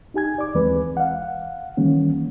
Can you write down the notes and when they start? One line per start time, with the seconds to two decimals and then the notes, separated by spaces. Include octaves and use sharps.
0.14 D#4 G4 G#5 G#6
0.38 D5 D6
0.55 D#2 E3 G#3 C4 B4
0.97 F5 F#5
1.77 D#3 E3 G3 A#3 C#4